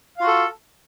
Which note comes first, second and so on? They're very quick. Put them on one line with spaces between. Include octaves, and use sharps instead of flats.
F5 F4 F#4 A4